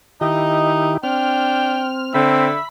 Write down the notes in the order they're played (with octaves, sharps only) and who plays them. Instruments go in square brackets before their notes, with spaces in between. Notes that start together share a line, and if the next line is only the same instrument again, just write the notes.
[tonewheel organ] D#3 E4 G4 [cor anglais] D#4 [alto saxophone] D#5
[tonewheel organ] C4 F6 [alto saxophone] D4 [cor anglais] G5
[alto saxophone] D3 [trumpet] C4 [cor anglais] E5 [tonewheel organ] B5